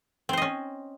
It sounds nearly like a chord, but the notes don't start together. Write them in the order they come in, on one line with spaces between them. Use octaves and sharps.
C4 C5 D#5 C#4